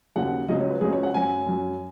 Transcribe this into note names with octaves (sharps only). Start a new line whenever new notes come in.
D#2 C#3 F#3 F#5
C#2 C#3 F#3 D#5
C#5
B4
C#2 C#3 F#3 G#4
C#5
F#5
F#2 F#3 G#5
F#2 F#3